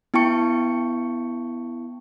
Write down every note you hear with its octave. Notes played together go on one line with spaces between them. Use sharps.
B3 E4 G5 A5 C#6 C#7